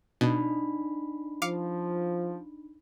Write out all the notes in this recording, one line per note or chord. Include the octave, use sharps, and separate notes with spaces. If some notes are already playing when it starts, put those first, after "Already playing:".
B2 D4 D#4 B5
F3 F5 D6 C#7